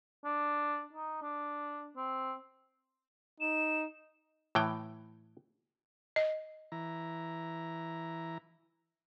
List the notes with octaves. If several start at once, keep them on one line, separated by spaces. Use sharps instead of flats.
D4
D#4
D4
C4
D#4 E7
A2 E3 G5
D#5
E3 A#5